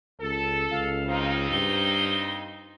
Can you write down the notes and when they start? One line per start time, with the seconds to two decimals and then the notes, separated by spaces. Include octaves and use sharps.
0.21 C#2 A4
0.71 C#2 F5
1.07 F2 C4 D#4
1.51 G2 G7